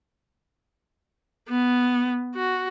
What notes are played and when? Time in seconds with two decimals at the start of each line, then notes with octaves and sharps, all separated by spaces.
1.49 B3
2.35 F#4